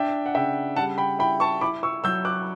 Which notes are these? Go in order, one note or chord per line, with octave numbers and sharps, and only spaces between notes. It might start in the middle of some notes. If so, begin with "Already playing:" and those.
Already playing: D4 E5 G5
F#5
C#3 E5 G5
G3 F#5 A5
G5 B5
E4 G5 B5
A5 C#6
E4 B5 D6
C#6 E6
F#3 E6 G6
D6 F#6